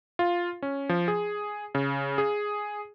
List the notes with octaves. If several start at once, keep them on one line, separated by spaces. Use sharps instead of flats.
F4
C#4
F3
G#4
C#3
G#4